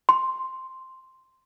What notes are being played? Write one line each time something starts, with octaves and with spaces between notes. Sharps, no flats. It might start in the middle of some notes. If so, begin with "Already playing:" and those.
C6